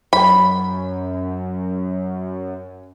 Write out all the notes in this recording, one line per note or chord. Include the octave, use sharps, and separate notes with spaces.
F#2 B5